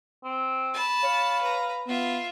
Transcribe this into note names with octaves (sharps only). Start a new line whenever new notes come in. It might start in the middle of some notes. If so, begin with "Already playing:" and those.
C4
A5 B5
C#5 F5
B4 A#5
B3 F4 E5